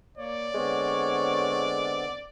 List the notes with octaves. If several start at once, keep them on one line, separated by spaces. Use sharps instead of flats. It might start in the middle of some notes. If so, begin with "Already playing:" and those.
A#3 C#5 D5
D3 G#3 B3 C4 C#5